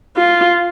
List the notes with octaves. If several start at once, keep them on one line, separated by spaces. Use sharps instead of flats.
F4